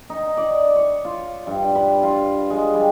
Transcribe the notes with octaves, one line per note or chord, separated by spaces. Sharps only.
D#4
D5
C#5
F4
G2
B4
F4
G#3
G3